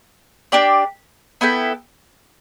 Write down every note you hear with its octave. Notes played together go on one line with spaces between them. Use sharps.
D4 G4 D5
B3 E4 A4 G5